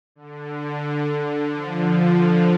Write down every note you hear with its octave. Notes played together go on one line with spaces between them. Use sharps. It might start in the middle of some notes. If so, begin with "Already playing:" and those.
D3
D3
D3
F3